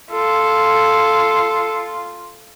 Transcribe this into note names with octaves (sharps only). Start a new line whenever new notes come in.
F4 A4